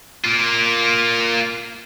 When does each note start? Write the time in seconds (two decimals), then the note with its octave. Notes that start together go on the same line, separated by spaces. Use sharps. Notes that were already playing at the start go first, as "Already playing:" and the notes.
0.24 A#3 F4